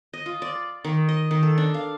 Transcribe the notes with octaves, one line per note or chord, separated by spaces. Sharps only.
D#5
F4
D5
D#3
D#5
D#3
A4
D4
F5